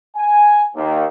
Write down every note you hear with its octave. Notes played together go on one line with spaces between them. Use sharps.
G#5
D#2